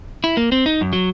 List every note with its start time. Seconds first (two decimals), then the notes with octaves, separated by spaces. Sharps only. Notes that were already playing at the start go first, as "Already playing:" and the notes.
0.24 E4
0.37 A#3
0.52 C4
0.66 D#4
0.81 F#2
0.93 F#3